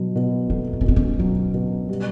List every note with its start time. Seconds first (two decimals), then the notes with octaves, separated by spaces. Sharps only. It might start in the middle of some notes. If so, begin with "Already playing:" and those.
Already playing: B2 F#3
0.15 B2
0.49 A3 D4
0.73 B3
0.81 C#4
0.84 B2 B3
0.96 C#4
1.19 F#3 C#4
1.54 B2
1.89 G3